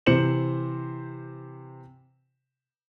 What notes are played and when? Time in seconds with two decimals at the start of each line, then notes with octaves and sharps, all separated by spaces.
0.06 C3 E3 C5 C#7 E7 F#7